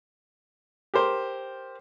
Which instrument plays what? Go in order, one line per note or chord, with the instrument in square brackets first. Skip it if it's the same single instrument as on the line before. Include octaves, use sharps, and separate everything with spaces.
[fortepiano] G4 A#4 C5